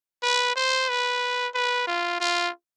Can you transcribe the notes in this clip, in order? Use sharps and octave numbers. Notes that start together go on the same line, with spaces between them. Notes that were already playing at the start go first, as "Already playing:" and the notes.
B4
C5
B4
B4
F4
F4